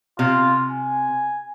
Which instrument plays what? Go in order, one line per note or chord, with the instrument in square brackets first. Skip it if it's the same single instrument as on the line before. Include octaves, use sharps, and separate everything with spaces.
[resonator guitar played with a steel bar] C3 [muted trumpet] F4
[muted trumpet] G#5